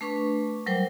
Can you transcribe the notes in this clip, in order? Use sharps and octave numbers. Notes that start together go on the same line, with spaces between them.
A3 D4 B4 C#6
F#3 G3 A#4 C5 G5